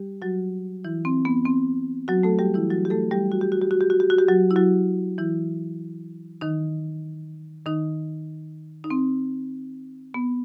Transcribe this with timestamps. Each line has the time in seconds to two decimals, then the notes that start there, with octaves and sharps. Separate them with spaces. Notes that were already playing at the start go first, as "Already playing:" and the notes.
Already playing: G3 G4
0.22 F#3 F#4
0.84 E3 E4
1.05 C4
1.25 B3
1.46 C4
2.08 F#3 F#4
2.23 A3 A4
2.39 G3 G4
2.54 E3 E4
2.70 F#3 F#4
2.85 G4
2.90 A3 A4
3.11 G3 G4
3.32 F#4
3.41 G4
3.52 F#4
3.62 G4
3.71 F#4
3.81 G4
3.90 F#4
4.00 G4
4.10 F#4
4.18 G4
4.28 F#3 F#4
4.51 E4
4.56 F#3 F#4
5.18 E3 E4
6.41 D#3 D#4
7.66 D#3 D#4
8.84 D#4
8.90 C4
10.14 B3